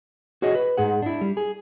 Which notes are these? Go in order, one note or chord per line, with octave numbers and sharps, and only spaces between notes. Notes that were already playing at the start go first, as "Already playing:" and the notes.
F#4 G#4 C#5 D#5
B4
G#2 G#4 F#5
D4 E4
G3
G#4